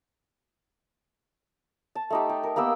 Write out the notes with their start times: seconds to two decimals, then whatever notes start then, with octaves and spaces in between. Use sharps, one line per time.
1.95 A5
2.10 A3 D#4 G4
2.29 G4
2.43 A#4
2.56 A#3 B3 G4 E6